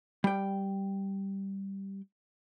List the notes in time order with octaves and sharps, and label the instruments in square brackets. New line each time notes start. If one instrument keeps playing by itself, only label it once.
[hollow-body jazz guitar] G3 G5